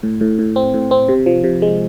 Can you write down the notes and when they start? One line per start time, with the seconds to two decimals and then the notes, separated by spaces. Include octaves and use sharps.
0.03 A2
0.21 A2
0.39 A2
0.56 C4
0.74 A2
0.91 C4
1.08 C3
1.26 F3
1.44 C3
1.62 G#3